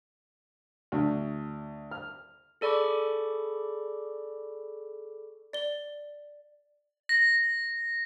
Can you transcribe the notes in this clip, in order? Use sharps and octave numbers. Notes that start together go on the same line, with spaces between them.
D2
F6
G#4 A4 D5 B5 C#6 D6
D5 G7
A#6